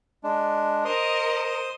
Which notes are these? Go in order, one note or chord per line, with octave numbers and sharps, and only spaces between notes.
G#3 D4
A#4 C5 D#5 C6 D#6